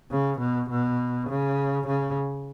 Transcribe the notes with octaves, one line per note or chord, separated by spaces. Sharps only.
C#3
B2
B2
C#3
C#3